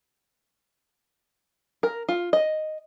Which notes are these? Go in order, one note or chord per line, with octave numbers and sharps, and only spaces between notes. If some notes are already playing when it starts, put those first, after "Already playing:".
A#4
F4
D#5